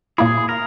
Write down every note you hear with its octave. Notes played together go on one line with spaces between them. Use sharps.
A#2 A#3 E4 G#4
A#4